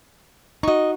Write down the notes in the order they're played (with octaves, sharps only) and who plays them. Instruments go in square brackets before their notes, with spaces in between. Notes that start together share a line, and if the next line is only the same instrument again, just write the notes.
[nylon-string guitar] D#4 F#4 [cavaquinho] D#5 C#6